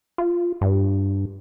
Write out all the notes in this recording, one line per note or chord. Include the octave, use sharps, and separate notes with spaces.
F4
G2